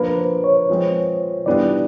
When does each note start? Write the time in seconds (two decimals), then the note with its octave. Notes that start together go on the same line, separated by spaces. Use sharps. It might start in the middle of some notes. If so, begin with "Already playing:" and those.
Already playing: F3 A#3 D4 B4
0.17 C5
0.44 C#5
0.70 F3 G#3 C4
1.46 E3 G3 B3 D4 F4 D5